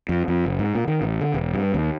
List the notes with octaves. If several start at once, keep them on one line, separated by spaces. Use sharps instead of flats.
F2
F2
F#1
G#2
A#2
D#3
A1
D3
E1
G2
D#2